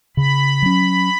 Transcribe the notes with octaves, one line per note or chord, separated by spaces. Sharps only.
C#3 B5
F#3 C#4